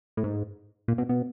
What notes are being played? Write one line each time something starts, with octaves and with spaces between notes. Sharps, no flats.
A2
G#2
A#2
B2
B2